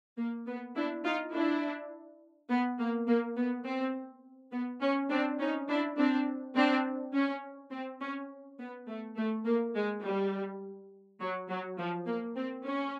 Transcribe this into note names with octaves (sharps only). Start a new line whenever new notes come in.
A#3
B3
D4 E4
D#4 F4
D4 E4
B3
A#3
A#3
B3
C4
B3
C#4
C4 D4
C#4 D#4
D4 E4
C4 D4
C4 D4
C#4
C4
C#4
B3
A3
A3
A#3
G#3
G3
F#3
F#3
F3
A#3
C4
C#4